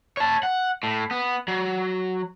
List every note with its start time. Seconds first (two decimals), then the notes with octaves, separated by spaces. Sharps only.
0.17 C#5 A5
0.43 F#5
0.83 A2
1.11 B3
1.48 F#3